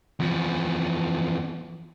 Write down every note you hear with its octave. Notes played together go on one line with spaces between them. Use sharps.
E2 F3